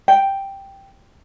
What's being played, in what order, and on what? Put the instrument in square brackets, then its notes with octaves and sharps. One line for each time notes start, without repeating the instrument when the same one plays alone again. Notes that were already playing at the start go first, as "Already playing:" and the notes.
[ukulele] G5